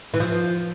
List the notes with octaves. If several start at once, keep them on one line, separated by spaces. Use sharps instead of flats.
E3
F3